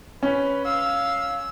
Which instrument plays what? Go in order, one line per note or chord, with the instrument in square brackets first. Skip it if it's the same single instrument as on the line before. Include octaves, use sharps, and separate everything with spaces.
[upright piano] C#4 [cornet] B4
[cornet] F5 [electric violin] E6